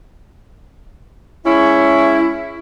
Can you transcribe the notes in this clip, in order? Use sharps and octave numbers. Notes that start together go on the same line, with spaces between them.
G#3 C#4 E4